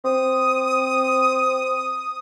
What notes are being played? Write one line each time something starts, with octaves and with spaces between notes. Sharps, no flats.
C4 D#6